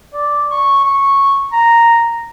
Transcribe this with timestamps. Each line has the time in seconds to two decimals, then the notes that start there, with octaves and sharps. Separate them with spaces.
0.14 D5
0.50 C#6
0.84 C#6
1.53 A#5